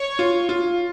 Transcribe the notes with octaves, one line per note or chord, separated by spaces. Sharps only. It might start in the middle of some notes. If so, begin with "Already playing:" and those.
Already playing: C#5
F4
F4